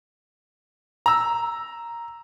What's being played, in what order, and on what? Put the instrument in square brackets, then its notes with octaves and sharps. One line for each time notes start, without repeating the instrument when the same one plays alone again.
[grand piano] A#5 E6